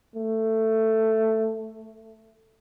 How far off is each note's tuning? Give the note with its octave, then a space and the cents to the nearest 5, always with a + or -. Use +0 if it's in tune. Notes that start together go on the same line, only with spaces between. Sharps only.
A3 +10